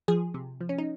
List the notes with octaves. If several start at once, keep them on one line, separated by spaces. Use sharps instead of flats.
F3 G#4
C3
F3
C#4
D#4